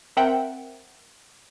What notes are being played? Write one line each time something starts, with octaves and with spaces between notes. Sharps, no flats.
C4 A#4 E5 F#5 G5